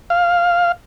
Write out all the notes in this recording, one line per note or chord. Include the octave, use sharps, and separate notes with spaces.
F5